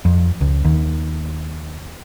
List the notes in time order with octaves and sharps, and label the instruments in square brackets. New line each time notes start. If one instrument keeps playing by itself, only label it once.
[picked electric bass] F2
C#2
D#2